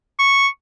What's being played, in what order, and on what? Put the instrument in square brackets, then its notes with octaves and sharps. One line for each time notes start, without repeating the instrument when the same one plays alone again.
[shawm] C#6